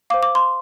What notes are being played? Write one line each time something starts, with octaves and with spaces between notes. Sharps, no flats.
C5 F5 D6
D6
C6